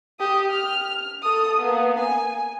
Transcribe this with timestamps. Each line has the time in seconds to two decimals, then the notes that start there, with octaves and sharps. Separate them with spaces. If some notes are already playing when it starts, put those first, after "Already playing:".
0.20 G4 D#6
0.51 F6
1.23 A4 D#6
1.58 A#3 B3
1.99 G#5